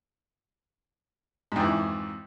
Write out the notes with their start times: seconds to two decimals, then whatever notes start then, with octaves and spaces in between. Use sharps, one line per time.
1.52 G#2
1.56 F2
1.60 E3